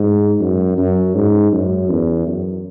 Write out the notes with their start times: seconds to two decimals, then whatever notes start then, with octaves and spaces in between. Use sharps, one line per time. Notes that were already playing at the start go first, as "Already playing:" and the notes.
Already playing: G#2
0.40 F#2
0.78 F#2
1.15 G#2
1.53 F#2
1.90 E2
2.27 F#2